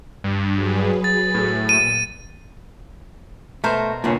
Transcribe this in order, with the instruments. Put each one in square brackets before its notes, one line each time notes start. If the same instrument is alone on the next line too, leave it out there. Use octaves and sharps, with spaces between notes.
[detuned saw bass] G2
[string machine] F#3 G#4 B4
[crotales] A6
[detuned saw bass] A2
[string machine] A#2 [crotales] D#7
[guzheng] B2 A#4 C5 [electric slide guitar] A3
[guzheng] G2 C#3 [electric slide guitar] A#2 B3 C#4